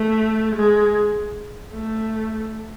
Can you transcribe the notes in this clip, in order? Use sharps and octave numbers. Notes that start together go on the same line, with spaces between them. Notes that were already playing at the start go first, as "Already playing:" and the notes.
Already playing: A3
G#3
A3